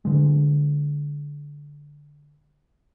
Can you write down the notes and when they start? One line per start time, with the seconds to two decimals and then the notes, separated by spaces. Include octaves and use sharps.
0.05 D3 G#3